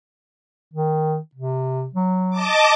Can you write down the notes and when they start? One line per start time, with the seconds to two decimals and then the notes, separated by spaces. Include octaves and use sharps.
0.74 D#3
1.35 C3
1.94 F#3
2.31 D#5 A5 D6